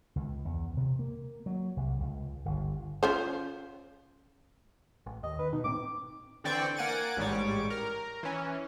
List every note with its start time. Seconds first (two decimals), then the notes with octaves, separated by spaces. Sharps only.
0.16 C#2
0.45 E2
0.77 C3
0.99 A#3
1.46 F#3
1.77 C2
2.00 C#2
2.45 G1
3.03 C#4 F4 C5
5.06 A1
5.23 D#2 D#5
5.39 D#3 B4
5.53 B2 D#4
5.64 A2 B3 C4 D6
6.44 D3 E3 C4 D5 G5 C#6
6.76 A#3 F#5 G#5 A6 D7
7.17 A1 G#2 G3 C#5 D6
7.70 A#4
8.23 E3 C#4